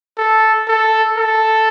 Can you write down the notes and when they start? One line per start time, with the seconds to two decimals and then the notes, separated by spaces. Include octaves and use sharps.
0.18 A4
0.68 A4
1.18 A4